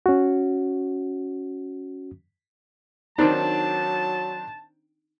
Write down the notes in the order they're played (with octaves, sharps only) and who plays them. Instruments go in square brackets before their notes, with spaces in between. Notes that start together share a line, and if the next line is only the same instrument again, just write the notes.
[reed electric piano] C#4 F#4
[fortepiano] D#3 C4 D4 [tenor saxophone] F#3 [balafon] D#4 [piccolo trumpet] A5